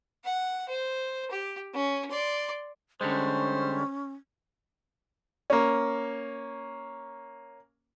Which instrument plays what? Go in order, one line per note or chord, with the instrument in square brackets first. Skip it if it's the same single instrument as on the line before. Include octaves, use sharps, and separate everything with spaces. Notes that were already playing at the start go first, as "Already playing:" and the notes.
[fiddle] F#5
C5
G4
C#4
D5 C6
[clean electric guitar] D3 G3 G#3 [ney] C#4 [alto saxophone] C5
[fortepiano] A#3 C#4